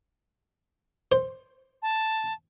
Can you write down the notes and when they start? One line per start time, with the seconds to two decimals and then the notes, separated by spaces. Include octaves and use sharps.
1.12 C5
1.82 A5